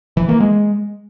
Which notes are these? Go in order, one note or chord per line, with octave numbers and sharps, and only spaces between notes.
E3
A#3
G#3